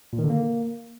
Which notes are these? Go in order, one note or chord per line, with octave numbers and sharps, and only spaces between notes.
A#2
D#3
D3
A#3